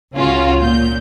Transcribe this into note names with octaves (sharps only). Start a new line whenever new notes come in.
C#2 C#3 C#4 F4 F#4
A#2 G6